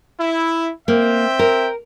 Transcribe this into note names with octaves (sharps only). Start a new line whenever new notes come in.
E4
A#3 C4 E5 G5
A#4